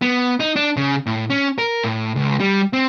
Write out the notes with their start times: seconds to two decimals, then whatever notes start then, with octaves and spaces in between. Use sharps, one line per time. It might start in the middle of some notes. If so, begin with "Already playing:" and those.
0.02 B3
0.40 D#4
0.56 D4
0.77 C#3
1.06 A2
1.30 C#4
1.58 A#4
1.84 A2
2.16 C#2
2.40 G3
2.73 C4